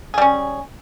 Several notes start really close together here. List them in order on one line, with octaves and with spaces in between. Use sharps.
G#4 G3 C#4